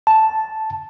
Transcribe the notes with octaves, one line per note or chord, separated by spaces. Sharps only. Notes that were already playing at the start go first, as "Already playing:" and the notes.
A5